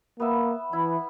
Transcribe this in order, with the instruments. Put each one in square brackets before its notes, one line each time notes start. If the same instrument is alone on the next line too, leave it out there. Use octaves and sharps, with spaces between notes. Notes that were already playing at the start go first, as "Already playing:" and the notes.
[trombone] A#3 [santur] B3 E5
[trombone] E3 [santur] E4